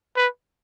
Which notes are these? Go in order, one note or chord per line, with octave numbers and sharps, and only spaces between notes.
B4